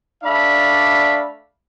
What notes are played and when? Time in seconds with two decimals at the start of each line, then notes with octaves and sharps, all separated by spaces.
0.24 A3 D4 D5 E5 F5 B5